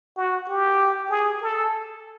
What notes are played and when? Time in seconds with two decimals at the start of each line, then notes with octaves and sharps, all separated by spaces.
0.17 F#4
0.49 G4
1.10 G#4
1.42 A4